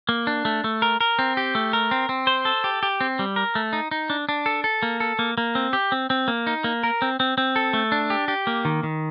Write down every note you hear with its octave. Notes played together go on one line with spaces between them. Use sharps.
A#3
D4
A3
A3
A#4
A#4
C4
G4
A3
A#4
C4
C4
C5
A4
G4
G4
C4
G3
A#4
A3
D#4
D#4
D4
D4
A4
A4
A#3
A4
A#3
A#3
C4
G4
C4
C4
A#3
D#4
A#3
A#4
C4
C4
C4
A4
A3
D4
G4
G4
A#3
D#3
D#3